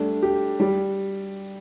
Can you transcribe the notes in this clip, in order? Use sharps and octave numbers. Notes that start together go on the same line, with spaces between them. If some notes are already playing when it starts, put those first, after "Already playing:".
Already playing: G3 A3 D4
G4
G3